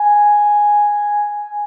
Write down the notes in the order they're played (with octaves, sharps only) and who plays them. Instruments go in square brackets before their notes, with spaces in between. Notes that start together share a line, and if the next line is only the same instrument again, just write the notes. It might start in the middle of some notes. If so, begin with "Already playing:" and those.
Already playing: [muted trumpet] G#5